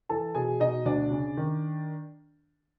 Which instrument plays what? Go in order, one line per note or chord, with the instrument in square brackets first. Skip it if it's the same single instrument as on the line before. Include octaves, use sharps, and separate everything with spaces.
[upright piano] E3 A4 A5
B2 G#4 G#5
B2 D#4 D#5
D2 D4 D5
C#3
D#3